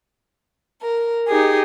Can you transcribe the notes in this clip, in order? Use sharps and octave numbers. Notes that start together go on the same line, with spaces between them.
A#4
D#4 G4 G#4